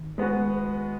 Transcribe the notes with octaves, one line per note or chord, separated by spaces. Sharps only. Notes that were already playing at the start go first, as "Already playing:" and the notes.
Already playing: D#3
G#3 B3 F#4 B4